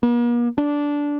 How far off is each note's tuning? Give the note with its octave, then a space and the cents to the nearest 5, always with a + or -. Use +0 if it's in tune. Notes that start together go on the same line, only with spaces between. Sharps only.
A#3 +45
D4 -10